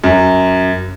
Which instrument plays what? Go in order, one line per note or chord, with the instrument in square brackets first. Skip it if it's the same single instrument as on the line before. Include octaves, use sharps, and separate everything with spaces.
[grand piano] F#2